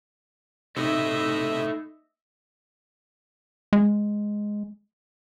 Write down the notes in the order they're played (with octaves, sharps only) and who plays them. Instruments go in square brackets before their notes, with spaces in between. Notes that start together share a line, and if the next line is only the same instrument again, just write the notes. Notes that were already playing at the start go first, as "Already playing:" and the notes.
[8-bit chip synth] C3 [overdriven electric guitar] A3 E4 [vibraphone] D#4 [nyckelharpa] D#5 E5
[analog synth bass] G#3